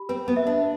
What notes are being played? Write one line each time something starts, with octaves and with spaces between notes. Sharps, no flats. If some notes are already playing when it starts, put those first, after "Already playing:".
Already playing: G4 B5
C4 B4
B3
E5
D4